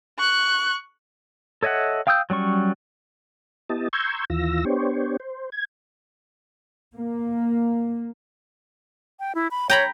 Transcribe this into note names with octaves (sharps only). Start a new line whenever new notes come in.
C#6 F#6
A4 C#5 D#5 E5 F#5
F5 G5 D#6 E6 G6
F#3 G3 C#4 C#6
B3 E4 G4 D#5 A5
A#5 C6 C#6 E6 G6 G#6
D#2 E3 F4 E6 A#6
B3 D4 G4 C5 C#5
C5
G#6
A#3
G5
E4
B5
C#5 G5 A#5 B5